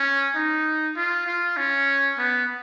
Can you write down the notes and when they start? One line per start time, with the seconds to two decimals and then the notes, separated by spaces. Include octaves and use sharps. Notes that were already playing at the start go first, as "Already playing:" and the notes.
Already playing: C#4
0.35 D#4
0.96 F4
1.26 F4
1.57 C#4
2.18 B3